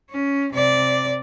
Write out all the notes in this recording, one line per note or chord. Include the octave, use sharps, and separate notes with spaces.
C#4
C3 D5